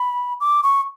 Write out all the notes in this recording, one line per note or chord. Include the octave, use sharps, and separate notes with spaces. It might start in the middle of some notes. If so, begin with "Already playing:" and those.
Already playing: B5
D6
C#6